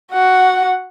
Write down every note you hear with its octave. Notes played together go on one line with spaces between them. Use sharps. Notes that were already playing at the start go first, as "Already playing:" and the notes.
F#4 F#5